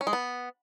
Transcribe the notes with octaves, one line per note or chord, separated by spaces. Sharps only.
C#4
G#3
B3